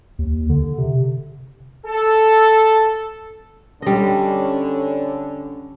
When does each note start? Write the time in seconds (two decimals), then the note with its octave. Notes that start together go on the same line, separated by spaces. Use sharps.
0.19 D#2
0.49 D3
0.78 C3
1.86 A4
3.82 D3 G3 C#4 D#5